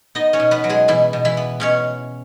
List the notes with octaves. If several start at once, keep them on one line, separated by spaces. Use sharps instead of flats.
B3 D#4 D#5
C#4 C#5
B2
B3 B4
F#3
G#3 G#4
B2 E3 E4
B2
E3 E4
B3
B2 C#4 C#5